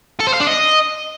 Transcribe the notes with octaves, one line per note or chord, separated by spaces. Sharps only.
A4
C5
F5
D4
D#5